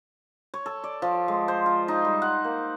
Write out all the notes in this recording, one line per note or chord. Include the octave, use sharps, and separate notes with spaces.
C#5
A4
D5
F3
G#3
C5
F4
D#4
G3
F#5
A#3